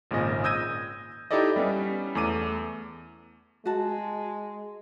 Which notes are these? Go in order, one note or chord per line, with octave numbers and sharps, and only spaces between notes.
G#1 A#2 C#3 D#5
D#6 E6 G6 G#6 A#6 D#7
D#4 E4 G4 A4 D5 D#5
G3 B3 C#4
E2 A3 D6 D#7
G#3 F#4 A5